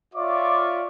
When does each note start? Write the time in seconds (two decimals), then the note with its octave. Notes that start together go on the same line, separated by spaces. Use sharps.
0.14 F4 C#5 D5 E5 C#6 D6